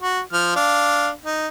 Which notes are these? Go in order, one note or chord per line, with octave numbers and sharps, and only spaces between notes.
F#4
F3 F6
D4 F5
D#4